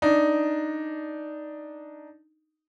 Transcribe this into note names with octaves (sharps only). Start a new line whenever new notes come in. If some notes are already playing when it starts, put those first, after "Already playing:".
D4 D#4